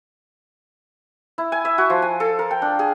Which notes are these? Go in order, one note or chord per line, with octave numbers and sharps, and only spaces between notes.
E4
G#5
E5
F#4
F3
G#5
A4
A#4
G5
D4
G#4